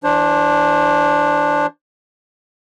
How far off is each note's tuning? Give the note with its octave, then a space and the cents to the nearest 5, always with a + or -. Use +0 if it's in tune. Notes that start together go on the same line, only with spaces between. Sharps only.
E3 +0 D4 +0 C5 +30